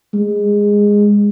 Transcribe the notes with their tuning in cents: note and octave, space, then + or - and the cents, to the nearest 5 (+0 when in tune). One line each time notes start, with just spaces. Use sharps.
G#3 -15